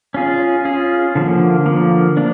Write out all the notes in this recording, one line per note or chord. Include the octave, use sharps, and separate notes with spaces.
C#4 F4 G#4
C#4 F4 G#4
D3 F3 A#3
D3 F3 A#3
A#3 D4